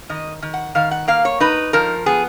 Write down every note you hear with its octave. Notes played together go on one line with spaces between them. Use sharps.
D#3 D#5
D#3
F#5
D#3 F5
F#5
A#3 F5
C#5
D#4 B4
F3 A#4
B3 G#4